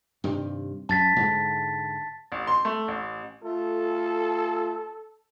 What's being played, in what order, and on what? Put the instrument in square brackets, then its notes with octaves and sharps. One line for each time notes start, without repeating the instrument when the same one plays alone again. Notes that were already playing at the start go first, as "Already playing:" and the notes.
[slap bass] G2 C3 D#3
[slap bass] F#2 [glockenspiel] A5 A6 B6
[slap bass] G#2 D3 G#3
[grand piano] A1
C6
A3
A1
[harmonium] A3 F4 [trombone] A4